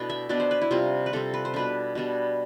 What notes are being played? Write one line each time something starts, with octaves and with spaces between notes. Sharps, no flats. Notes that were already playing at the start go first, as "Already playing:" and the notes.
Already playing: B2 A3 B3 D4 E4 G5
E5
B2 B3 D4 D5
C5
B4
E4
C3 G3 C4 F4
B4
C3 G3 C4 A4
B4
C5
B2 G3 D4 B4
B2 G3 D4